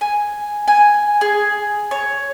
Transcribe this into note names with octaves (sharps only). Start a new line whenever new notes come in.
G#5
G#5
G#4
C#5